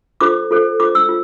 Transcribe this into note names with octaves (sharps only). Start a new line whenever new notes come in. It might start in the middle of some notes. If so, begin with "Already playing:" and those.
F4 A4 C5 D6
F4 A4 C5
F4 C5 D6
E6
F4